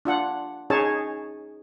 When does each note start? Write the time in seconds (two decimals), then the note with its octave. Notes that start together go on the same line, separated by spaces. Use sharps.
0.05 D4 F4 F#5
0.70 C#4 D#4 G#4 C#5 A5